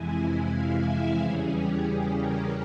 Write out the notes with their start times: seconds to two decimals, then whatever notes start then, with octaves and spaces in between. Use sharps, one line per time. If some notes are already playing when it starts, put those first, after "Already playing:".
Already playing: F2 C3 E3 G#3 E4 G#5
0.21 G#5
0.54 F5
0.87 E5
1.20 E2 C#3 E3 G3 C#4 G#4
1.53 G4
1.87 G#4
2.19 A#4